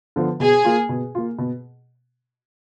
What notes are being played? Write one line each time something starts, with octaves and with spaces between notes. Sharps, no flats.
D3 F3 B3
B2 G#4
A#3 F4
B2
A#3 F4
B2